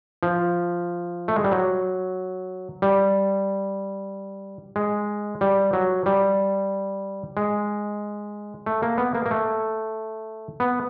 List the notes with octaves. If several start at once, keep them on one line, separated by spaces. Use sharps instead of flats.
F3
A3
G#3
G3
F#3
G3
G#3
G3
F#3
G3
G#3
A3
A#3
B3
A#3
A#3
A3
B3